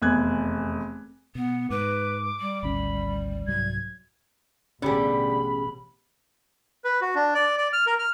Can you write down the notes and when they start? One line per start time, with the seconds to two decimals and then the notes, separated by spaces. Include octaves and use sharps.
0.02 F1 E2 F#6 G#6
1.35 B2 B3
1.70 G#2 B4 D6
2.40 G3
2.63 G#1 D2 C#4 B5
3.47 C2 G#2 F#3 G#6
4.82 A1 B2 D3 G3 C#4 G4 G#4 B5
6.84 B4
7.01 F#4
7.15 D4
7.34 D5
7.58 D5
7.73 F6
7.87 A#4
7.99 F6